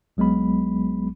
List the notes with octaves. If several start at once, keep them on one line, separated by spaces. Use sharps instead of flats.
A#1 F#3 G#3 B3 B5